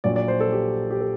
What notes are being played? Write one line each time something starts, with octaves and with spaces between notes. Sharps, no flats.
A#1 A#2 F#3 D5
D5
C5
A4
G4
G4
A4